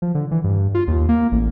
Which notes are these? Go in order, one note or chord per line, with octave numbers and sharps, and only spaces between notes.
F3
D3
E3
G2
F4
D#2
A#3
A1